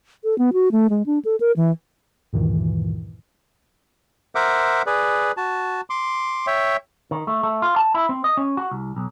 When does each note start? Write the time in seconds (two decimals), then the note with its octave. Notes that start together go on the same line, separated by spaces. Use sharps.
0.24 A4
0.38 B3
0.53 F#4
0.72 A3
0.90 G#3
1.06 D4
1.25 A4
1.40 A#4
1.57 E3
2.33 D2 G2 A#2 D#3 E3
4.35 A#4 C5 E5 F#5 D6
4.86 G#4 B4 D5
5.37 F#4 A5
5.90 C6 D6
6.47 C#5 E5 G5
7.11 D#3
7.27 A3
7.43 A3
7.62 F4
7.76 A5
7.94 E4
8.09 C4
8.24 D#5
8.37 C#4
8.57 F#4
8.71 C2
8.96 B1